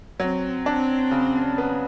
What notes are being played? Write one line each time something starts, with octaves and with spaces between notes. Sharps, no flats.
F#3 C4
C4 D4
C#3
B3